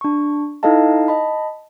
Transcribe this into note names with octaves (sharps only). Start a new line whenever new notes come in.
D4 C#6
D#4 E4 A4 D#5 F5 A5
D#5 A5 B5